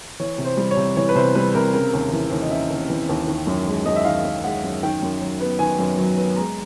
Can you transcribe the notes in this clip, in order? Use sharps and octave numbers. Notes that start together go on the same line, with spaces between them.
E3 C#5
C3
C5
G3
C#5
C3
E3 C#5
B4
C3 C5
G3 B4
C3 A#4
C#3 A#4
D#2
E3
D#2
D#5
C#3 E5
D#2
E3
D#2
D#3
F#2
G#3
F#2 D#5
E5
D#3 F5
F#2
G#3 F#5
F#2
D#3 G5
F#2
F#3
B3
D#3 G#5
F#2
F#3
B3
G#3 A#5